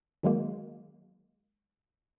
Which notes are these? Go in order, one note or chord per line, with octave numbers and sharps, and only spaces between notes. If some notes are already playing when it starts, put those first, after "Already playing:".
D#3 F#3 G#3 A#3